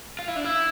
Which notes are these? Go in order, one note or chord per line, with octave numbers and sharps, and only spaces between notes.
F4
E4
D4
E4